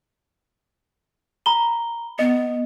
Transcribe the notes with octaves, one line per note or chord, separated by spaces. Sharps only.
A#5 B5 G7
B3 D#5